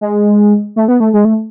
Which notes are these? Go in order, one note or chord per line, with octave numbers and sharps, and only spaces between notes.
G#3
A3
B3
A3
G#3
A3